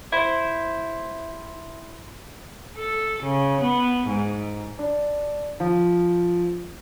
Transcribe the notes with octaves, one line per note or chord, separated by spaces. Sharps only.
E4 C5
A4
C#3
B3
G#2
D4
F3